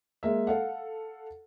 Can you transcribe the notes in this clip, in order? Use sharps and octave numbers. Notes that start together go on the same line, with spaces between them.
G#3 A#3 E5
A4 F5 F#5